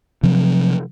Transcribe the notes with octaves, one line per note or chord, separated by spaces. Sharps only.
C3 F3 F#3 C4